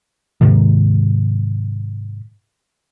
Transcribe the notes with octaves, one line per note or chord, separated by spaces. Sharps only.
G#2 C3 D#3